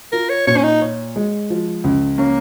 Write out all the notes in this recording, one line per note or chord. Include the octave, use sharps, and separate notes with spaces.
F4 A#4
C#5
A#2 C#5
C#4
D#4
C#5
G#3
F3
C#2
A#3 C#4